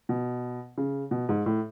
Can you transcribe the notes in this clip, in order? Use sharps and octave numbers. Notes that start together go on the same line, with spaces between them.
B2
C#3
B2
G#2
A2